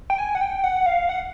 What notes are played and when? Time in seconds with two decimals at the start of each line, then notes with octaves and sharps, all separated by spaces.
0.10 G5
0.18 G#5
0.35 F#5
0.41 G5
0.64 F#5
0.86 F5
1.09 F#5